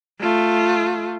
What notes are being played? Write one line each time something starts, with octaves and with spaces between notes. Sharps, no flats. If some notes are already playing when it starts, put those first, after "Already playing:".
A3 F4